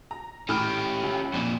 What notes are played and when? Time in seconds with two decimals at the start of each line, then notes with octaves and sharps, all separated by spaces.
0.11 A#5
0.49 A2 C#4 G4 F6
1.03 C#2
1.34 F2 A#2